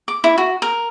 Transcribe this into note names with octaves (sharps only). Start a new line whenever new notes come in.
D6
E4
F#4
A#4